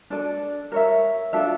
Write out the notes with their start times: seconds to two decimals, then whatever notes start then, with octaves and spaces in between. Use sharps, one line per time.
0.10 D4 A4 D5
0.72 A#4 C#5 E5
1.33 D4 F4 A4 E5